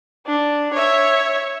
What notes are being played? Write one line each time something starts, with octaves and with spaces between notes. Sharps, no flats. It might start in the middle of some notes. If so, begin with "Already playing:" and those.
D4
C#5 E5